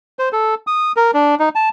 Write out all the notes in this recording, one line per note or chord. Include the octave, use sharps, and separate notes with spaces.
C5
A4
D#6
A#4
D4
D#4
A5